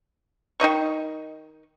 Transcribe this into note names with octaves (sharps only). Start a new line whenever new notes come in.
D#3 D#4 D#5 C#6